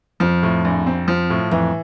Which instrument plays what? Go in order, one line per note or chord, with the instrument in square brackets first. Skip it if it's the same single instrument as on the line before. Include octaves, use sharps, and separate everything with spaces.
[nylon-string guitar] F2 [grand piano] F3
[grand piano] A2
A#1
C4
F3
A2
[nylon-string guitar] F2 [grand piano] E3